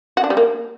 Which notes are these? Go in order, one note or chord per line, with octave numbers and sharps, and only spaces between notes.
F#4
D4
G3
A#3